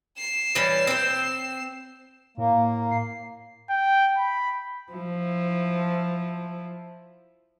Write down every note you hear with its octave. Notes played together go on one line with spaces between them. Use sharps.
C7 E7
E3 G3 C#4
C4 C5
A2 A#3
C7
G5
B5
F3 E4